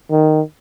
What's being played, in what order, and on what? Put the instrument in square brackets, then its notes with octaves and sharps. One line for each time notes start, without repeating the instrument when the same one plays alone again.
[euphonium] D#3